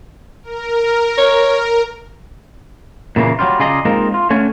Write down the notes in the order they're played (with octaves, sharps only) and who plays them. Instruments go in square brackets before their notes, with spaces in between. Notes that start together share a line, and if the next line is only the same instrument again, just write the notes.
[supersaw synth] A#4
[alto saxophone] C#5
[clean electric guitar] A#2 C#3 E3 A#3
F#3 G3 F4
C#3 F4 G#4 D5 D#5 A#5
G#3 A#3 C4 D#4 F4 A#4
F4
D3 A3 C#4 G#5